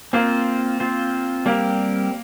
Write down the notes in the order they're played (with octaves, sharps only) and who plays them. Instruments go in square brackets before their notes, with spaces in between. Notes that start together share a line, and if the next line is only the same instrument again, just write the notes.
[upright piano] A#3 [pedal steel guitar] C4 F4 C5
[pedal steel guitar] C4 F4 C5
[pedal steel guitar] G3 C4 G4 A#4 [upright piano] A#3